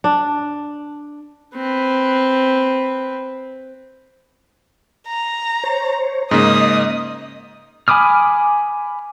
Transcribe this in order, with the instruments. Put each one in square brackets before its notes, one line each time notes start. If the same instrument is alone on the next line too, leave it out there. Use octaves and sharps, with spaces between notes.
[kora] D4
[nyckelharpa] C4 B4
[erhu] A#5
[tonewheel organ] C5 C#5
[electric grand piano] G#2 C#3 A#3 [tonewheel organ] D#5 [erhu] D#6
[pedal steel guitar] G#5 B5 D6 D#6 F6